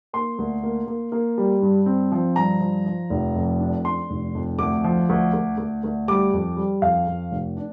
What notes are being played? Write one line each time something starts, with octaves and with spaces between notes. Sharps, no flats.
A#3 C6
D2
A#3
A#3
A#3
G3
G2
C4
F3
G2 A#5
F3
F3
F1
F2
D4
D4 C6
F1
F2
D2 D6
F3
D2
D2
D2
D2
G3 D6
F2
G3
F2 F5
F2
F1
D4